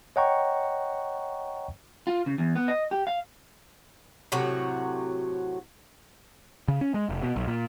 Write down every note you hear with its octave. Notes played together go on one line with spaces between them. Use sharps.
C#5 D#5 F#5 G5 A#5 C#6
F4
C#3
E2
B3
D#5
G4
F5
A2 C3 F#3 F#4
C#3
C#4
G#3
F1
B2
B1
A#2